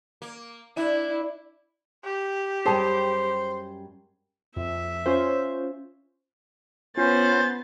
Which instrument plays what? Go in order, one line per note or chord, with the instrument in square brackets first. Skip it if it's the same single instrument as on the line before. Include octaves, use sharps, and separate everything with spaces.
[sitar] A#3
[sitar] D4 [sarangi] E4
[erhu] G4
[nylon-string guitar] F#2 G3 [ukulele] G#4 A5 [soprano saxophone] C5
[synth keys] F2 [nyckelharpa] E5
[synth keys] C#4 F4 C5
[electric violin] B3 A6 [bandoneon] C#4 [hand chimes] F4 [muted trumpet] C5